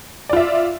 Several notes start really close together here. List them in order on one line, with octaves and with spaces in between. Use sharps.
D5 F4 E5